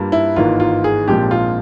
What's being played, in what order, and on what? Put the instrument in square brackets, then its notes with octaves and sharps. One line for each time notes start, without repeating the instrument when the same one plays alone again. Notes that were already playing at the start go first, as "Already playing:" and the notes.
Already playing: [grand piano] G2 G3 A#3 F4
[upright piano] E4
[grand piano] G#1 G#2 E3 A#3 [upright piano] F4
[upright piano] F4
G#4
[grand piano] A#1 A#2 F3 G#3 C4 [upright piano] G4
[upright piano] F4